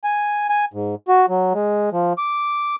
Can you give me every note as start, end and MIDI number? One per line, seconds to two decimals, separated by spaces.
0.04 0.47 80
0.50 0.65 80
0.73 0.95 44
1.08 1.26 66
1.29 1.53 54
1.54 1.90 56
1.92 2.13 53
2.18 2.76 86